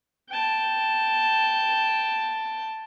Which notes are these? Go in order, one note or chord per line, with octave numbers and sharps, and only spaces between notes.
G5 A5